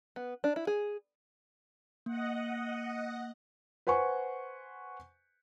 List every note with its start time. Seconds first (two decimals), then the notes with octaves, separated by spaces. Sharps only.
0.16 B3
0.44 D4
0.56 E4
0.67 G#4
2.06 A#3 D#5 F#5
3.87 B4 C5 F#5 G#5 C#6